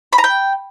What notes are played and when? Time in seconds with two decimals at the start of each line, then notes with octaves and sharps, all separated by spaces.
0.13 B5
0.18 A#5
0.24 G5